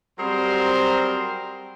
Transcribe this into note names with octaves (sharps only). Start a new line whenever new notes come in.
F#3 G3 C4 G#4 A#4 C5